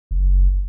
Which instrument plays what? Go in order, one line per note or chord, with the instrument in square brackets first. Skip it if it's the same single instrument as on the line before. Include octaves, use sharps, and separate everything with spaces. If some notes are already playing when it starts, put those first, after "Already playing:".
[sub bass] F#1